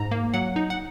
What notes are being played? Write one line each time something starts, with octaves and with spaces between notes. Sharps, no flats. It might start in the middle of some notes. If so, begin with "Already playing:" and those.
Already playing: G#2 A#5
A#3
F#3 F#5
D#4
F#5